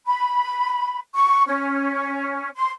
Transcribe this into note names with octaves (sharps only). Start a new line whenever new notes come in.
B5
C#6
C#4
C6